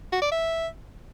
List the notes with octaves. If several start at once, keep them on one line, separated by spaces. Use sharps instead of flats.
F#4
D5
E5